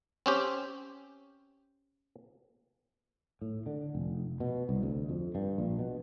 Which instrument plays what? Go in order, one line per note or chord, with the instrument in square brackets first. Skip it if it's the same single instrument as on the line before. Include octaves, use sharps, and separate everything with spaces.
[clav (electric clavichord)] C4 C#4 G4
[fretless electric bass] A2
D3
F1
B2
C2
D2
F2
G2
A#1
B2